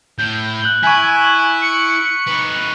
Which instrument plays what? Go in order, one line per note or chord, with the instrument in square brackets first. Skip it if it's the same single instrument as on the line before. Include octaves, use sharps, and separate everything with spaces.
[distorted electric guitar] A2 [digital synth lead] G6
[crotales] F#6 F#7 G7
[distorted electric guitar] E4 [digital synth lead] G#5 [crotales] C#6 B6
[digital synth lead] C#7
[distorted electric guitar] D#4 B4